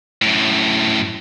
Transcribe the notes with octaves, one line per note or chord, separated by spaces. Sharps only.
F#2 A2